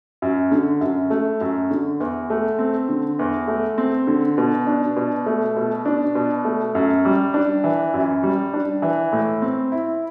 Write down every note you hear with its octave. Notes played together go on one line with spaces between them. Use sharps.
F#2
D3
F#2
A3
F#2
D3
E2
A3
C4
D3
E2
A3
C4
D3
B2
D4
B2
A3
B2
D4
B2
A3
F#2
G3
D4
E3
F#2
G3
D4
E3
A2
C4
E4